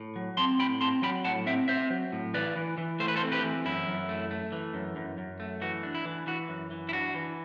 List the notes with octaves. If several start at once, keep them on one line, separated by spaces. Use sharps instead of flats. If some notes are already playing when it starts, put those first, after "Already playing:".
Already playing: A2
F#3
C4 A5 C6
A2 G5 B5
C4 A5 C6
F#3 G5 B5
A2 F#5 A5
C4 E5 G5
C4 C5 E5
F#3
A2
E3 B4 D5
E3
E3
A3 C5
B4
A4 C5
C4
G4 B4
E3
F#2 E4
F#2
A3
A3
E3
F#2
F#2
F#2
A3
E3 F#4
D4
E4
E3
E3 F#4
F#2
E3
E4
D4 F#4
E3